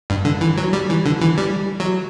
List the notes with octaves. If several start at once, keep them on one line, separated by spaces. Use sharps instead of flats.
G2
D3
E3
F#3
G3
E3
D3
E3
G3
F#3